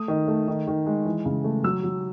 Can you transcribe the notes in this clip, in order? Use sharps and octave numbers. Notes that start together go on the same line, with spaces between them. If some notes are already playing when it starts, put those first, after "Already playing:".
Already playing: A3 D#6
D#3
A3
D#3
D#3
G#3
E3
C#3
A3
F#3 E6
F#3